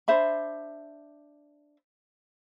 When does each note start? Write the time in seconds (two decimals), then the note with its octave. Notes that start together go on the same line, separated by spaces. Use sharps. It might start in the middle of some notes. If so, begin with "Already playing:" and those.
0.08 D4 C5 E5 B5